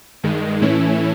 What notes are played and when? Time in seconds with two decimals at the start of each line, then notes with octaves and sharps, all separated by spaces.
0.23 G2 D#3 G#3
0.61 A2 E3 A3 C#4 E4